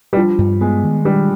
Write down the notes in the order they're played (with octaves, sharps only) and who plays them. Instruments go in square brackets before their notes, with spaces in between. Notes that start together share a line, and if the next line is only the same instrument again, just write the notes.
[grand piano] G3
[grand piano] F3 [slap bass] D4
[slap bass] G2
[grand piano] G#3 [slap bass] B3
[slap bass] D#3
[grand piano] G3 [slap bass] D4